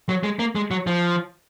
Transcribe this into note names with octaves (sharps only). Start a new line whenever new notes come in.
F#3
G#3
A#3
G#3
F#3
F3